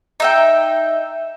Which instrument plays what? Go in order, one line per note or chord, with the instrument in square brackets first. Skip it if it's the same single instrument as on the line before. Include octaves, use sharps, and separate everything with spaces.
[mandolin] D#4 E5 G5